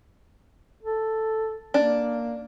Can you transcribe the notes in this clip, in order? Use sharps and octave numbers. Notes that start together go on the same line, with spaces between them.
A4
A#3 D4